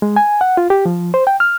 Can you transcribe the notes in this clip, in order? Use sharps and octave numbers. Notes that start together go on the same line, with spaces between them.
G#3
G#5
F#5
F4
G4
F3
C5
G5
F6